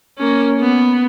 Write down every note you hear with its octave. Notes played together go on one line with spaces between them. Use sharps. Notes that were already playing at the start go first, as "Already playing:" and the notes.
A#3 C#4
B3